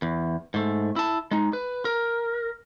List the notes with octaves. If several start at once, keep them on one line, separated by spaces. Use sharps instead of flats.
E2
G#2 A3
E4 A5
G#3 D#4
B4
A#4